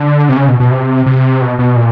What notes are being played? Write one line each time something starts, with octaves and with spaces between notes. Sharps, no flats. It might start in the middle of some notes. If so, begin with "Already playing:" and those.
Already playing: D3
C3
C#3
B2
B2
C3
C3
B2
B2
A#2